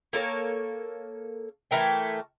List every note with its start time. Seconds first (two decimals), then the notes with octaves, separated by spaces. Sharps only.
0.13 A#3 A4 C#5
1.71 E3 A3 A#4 G5